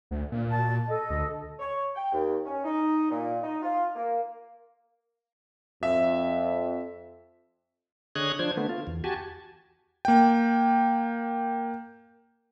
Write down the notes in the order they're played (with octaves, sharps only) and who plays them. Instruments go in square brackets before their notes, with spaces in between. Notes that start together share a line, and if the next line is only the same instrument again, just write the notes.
[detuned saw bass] D2
A#2
[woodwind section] B2 A5
A4 D#5
[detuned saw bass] D2
[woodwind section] C#5
G5
D#2
C#4
D#4
A#2
D#4
F4
A#3
[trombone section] F2 [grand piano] E5
[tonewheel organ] D3 G#4 C#5 D#5 F#6 G#6
F3 D4 C5 G#6
D3 A3 B3
F4
E2
F#4 G4 G#5 A5
[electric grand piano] A#3 G5